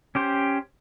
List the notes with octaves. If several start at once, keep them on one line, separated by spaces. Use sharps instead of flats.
C#4 G4 C5